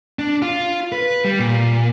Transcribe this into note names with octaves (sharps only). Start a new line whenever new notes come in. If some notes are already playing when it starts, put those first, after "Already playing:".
D4
F4
B4
G3
A#2